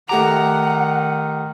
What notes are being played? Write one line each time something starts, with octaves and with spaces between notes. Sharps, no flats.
D#3 A3 G4 F#5 A#5 D6